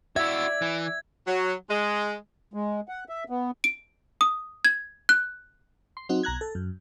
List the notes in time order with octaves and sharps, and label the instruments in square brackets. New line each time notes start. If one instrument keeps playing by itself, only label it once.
[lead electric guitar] E4 F#4 [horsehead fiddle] D5 [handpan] E5 [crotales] G#6
[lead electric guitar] E3
[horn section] F#3
G#3
[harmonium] G#3
F#5
E5
B3
[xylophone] D7
D#6
G#6
F#6
[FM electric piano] C6
F#3 C4 D#4 F#4
B1 A#5 F#6 G#6
A4
F#2